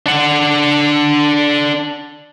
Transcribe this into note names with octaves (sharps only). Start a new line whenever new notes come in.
D4 F#5